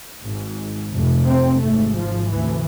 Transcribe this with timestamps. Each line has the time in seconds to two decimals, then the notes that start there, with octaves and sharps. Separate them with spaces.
0.21 G#1 G#2
0.90 F1 F2 C3
1.26 C4
1.60 G#1 G#2 A3
1.95 F3
2.30 D2 C3 E3